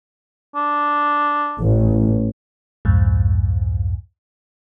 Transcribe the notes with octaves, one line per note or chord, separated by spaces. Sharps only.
D4
A1
C2 F2 G#2